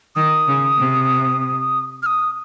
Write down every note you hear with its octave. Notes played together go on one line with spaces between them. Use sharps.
D#3 D#6
C#3
C3
F6
D#6